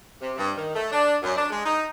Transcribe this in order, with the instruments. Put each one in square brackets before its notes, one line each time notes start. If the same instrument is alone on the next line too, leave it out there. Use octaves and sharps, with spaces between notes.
[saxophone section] C3
G2
D#3
A3
D4
F#2
D4
G#3
D#4